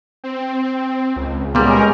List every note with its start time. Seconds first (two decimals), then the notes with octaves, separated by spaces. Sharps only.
0.24 C4
1.16 C#2
1.55 A#2 G3 G#3 B3 C#4 G#4 A#4